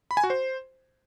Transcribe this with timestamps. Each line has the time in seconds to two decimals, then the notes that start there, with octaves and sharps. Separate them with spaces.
0.11 B5
0.17 G#5
0.24 F#4
0.30 C5